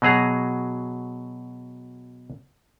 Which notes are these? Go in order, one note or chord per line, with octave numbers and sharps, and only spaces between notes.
B2 F#3 G#4 A#5